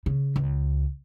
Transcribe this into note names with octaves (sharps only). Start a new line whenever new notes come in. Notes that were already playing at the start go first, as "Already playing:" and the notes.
C#3
C#2